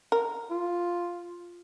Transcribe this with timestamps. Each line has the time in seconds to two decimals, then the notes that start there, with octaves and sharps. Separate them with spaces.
0.12 A#4
0.50 F4